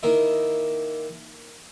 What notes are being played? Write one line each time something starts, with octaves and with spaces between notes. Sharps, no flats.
D#3 A#3 D#4 E4